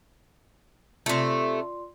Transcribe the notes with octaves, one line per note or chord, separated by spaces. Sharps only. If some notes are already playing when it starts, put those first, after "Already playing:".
C3 A3 F4 D5 C6